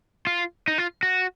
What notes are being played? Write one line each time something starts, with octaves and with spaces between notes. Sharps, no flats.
F4
D#4
F4
F#4